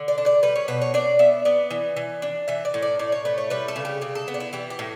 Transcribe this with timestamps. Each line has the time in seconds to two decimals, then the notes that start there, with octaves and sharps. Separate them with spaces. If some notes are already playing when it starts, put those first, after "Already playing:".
Already playing: D3
0.08 D5
0.18 D4
0.26 D5
0.43 G3 B4
0.56 C#5
0.68 B2 B4
0.81 C#5
0.94 D4 D5
1.19 B3 E5
1.45 B3 D5
1.70 E3
1.96 E3
2.22 D4
2.48 E3 E5
2.65 D5
2.74 A2
2.82 D5
2.99 A2 D5
3.12 C#5
3.25 A3 B4
3.38 C#5
3.50 G3 B4
3.68 A4
3.76 C#3
3.85 G4
4.01 C#3 G4
4.15 A4
4.28 B3
4.34 D4
4.40 E4
4.53 E3 G4
4.70 G4
4.79 A2